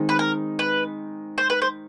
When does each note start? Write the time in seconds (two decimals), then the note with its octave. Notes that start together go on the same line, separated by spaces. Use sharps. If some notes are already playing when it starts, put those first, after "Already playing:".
Already playing: D#3 G#3 C4 D#4
0.09 B4
0.19 A#4
0.59 B4
1.38 C5
1.50 B4
1.62 C5